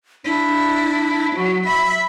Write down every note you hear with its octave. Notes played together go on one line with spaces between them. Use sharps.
D4 E4
F#3 F#4
E5 B5